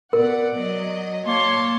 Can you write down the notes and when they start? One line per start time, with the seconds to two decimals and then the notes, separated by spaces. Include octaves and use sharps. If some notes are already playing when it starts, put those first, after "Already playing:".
0.13 B2 A#4 D5 F#5
0.55 F#3 D#5
1.27 A#3 C#5 A5 C6